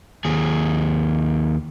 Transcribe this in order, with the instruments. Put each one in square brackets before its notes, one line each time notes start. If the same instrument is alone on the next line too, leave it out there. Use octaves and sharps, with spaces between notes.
[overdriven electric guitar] D#2 G#4